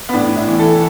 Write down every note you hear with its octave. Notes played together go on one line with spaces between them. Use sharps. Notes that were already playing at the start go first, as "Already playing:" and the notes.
B3
A2 D4
E4
E3
A4